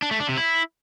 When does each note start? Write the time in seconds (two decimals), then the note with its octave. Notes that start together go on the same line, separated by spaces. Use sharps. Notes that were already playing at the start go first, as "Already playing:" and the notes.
0.02 D4
0.11 A3
0.20 D4
0.29 C3
0.38 E4